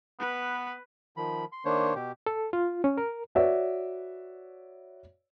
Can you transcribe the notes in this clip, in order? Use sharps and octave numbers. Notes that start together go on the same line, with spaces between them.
B3 B4
D#3 F3 B5
C6
D#3 A#3 D4 C5 C#5
B2 G4
A4
F4
C#4
A#4
F#4 B4 C#5 D5 E5